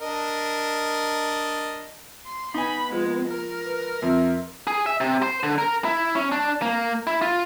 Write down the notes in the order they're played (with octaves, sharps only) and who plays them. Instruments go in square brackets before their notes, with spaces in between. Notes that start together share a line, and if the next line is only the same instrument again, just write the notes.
[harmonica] D4 A#4 D#5
[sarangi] C6
[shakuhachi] B3 [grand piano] D#4 G#5 [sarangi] B5
[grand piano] F3 [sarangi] G#3
[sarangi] A#4
[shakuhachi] B4
[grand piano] F2 [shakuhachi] E5
[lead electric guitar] G#4
E5
C3
C5
D3
A#4
E4
C#4
D4
A#3
E4
F4